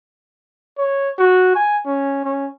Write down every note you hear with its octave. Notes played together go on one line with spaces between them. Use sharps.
C#5
F#4
G#5
C#4
C#4